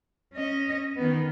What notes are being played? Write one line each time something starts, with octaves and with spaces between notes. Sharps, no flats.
C#4 D#5
D#3 B3